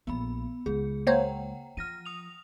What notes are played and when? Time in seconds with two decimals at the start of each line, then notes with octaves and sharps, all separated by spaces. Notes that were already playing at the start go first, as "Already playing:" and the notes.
0.07 A#1 A#2 B3 B5
0.66 C#2 G#4
1.07 A#3 C5 C#5 F#5 G5 A#5
1.77 F3 F6 A#6 D#7
2.05 D#6 F7